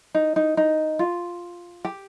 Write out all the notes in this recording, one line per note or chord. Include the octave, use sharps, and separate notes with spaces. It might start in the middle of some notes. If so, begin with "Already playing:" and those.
D#4
D#4
D#4
F4
G4